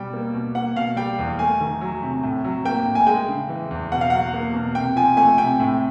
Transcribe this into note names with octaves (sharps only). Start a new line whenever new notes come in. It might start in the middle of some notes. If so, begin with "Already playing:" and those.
Already playing: B2 G3 G5
A#3
B2
A#3 F#5
B2 F5
G3 G5
E2
A3 G#5
D#3
F#3
C3
A2
F#3
A#3 G5
A2
G#5
G#3 G5
C#3
E3
E2
B2 F#5
F5
F#3 F#5
A#3
B2
C3 G5
F3 G#5
A3 G#5
C3 G5
A2